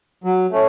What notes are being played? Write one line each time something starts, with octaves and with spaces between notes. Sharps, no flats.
F#3
A3 C#4